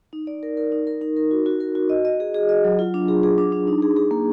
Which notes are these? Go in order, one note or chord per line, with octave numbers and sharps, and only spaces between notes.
D#4
D5
A#4
A#4
D#4
A#4
D#4
A#4
F#4
F#4
A#4
F#4
D#5
D#5
G#4
G#4
D#5
F#3
F4
D4
G#4
G#4
D4
D4
D#4
G#4
G#4
A#3